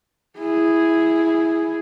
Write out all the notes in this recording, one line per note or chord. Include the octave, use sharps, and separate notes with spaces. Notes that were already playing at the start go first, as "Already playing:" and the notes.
E4 G#4